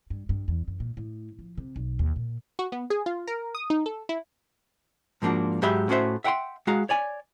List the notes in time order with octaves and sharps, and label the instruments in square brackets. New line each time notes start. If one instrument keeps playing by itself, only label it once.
[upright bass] G2
G2
E2
F#2
A#2
A2
F3
C3
B1
D#2
A#2
[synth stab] F#4
B3
G#4
F4
A#4
D#6
D#4
A4
E4
[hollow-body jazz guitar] G#2 F3 A#3 D4 F#4
G#2 F#3 G4 E5 B5
A2 C#4 F#4 C5 E5
E5 F#5 G5 B5 C6
G#3 F#4 F5 A#5
C#5 D5 G#5